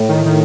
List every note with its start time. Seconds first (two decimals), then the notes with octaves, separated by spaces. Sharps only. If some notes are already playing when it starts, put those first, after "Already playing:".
Already playing: A2
0.09 D#3
0.26 D#3